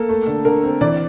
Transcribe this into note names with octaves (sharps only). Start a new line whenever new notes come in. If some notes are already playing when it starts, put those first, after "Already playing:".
Already playing: A#3 A4
A3
D3
D3 A#4
C4
E3 D5